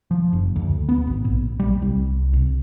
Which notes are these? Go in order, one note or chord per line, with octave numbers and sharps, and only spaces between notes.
F3
F#1
D2
B3
G#1
A#1
G3
C2
C2